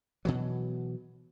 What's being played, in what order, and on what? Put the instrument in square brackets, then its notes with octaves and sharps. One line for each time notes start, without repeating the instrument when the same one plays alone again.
[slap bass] B2 E3 F#3